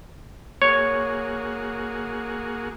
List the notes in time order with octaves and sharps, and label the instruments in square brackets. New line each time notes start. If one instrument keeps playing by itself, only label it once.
[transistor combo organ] A#3 F#4 G#4 [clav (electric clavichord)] C#5